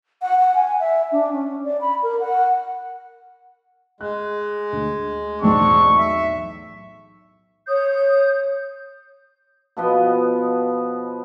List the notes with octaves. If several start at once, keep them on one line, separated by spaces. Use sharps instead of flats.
F#5
F#5
G#5
E5
D4
C#4
D5
B5
A#4
F#5
G#3 F#6
D2
B1 E2 A2 G#3 C4 D4 C#6
E5
C#5 D#6 G6
B2 F3 B3 D#5